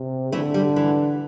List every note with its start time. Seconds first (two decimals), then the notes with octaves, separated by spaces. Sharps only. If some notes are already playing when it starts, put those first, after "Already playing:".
Already playing: C3
0.32 D3 E3 A3
0.54 G3
0.76 E3